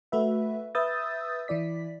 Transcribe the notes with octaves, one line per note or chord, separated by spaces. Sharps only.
A3 F#4 B4 E5
B4 E5 D#6 E6 G6 A6
E3 E4 D5 B6